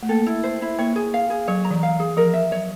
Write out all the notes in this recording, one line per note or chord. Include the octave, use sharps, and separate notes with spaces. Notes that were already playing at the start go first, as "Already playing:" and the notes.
A3
A#3 A4
E4
C5
E4
A#3 C#5
G#4
F5
G#4
F#3 C#5
A#5
E3
F5
G#4
F3 A#4
E5
F#3 C#5